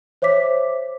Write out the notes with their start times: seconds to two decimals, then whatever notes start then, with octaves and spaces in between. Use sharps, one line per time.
0.22 C5 C#5 E5 D6 B6